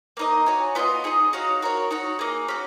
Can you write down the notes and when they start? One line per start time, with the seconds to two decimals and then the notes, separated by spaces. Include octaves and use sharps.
0.17 A#3 D#4 A#4 D#5
0.46 F#4 C#5 G#5
0.75 B3 F4 B4 D#5
1.04 D#4 G#4 D#5
1.33 D#4 F#4 C#5 F5
1.62 F#4 A#4 C#5
1.91 D#4 F#4 C#5
2.19 A#3 D#4 G#4
2.48 C#4 F#4